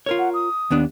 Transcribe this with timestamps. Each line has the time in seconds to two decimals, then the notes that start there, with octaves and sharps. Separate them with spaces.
0.06 F4 A#4 C#5
0.19 F#5
0.34 D#6
0.71 D#2 B3 D4